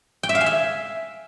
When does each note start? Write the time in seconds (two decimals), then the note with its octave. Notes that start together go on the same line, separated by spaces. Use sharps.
0.23 G5
0.29 E5
0.35 F5
0.41 G#5
0.46 E5